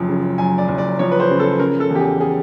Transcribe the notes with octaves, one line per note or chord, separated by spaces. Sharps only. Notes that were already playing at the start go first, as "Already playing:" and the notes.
Already playing: F#1 F#2 F3
C#3
F#2 G#5
D5
F#1
D5
F3 C#5
B4
C5
C#3
A4
C#3 A#4
A4
E2
G4
G#4
G#4